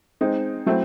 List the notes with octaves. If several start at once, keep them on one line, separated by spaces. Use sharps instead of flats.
G#3 C4 D#4
F#3 A3 C4 E4